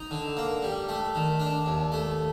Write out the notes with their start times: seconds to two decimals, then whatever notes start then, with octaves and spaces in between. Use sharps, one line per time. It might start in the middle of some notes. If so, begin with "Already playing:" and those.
Already playing: D#4
0.11 D3
0.37 A#3
0.63 G3
0.89 A3
1.15 D#3
1.40 D4
1.66 D#2
1.92 A3